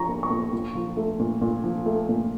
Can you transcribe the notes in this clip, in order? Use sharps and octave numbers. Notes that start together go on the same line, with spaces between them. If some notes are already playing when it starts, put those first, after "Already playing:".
Already playing: F3 D4 A#5 C#6
A#3
C#6
A#2
A#2
F3
A3
A#2
A#2
F3
A3
A#2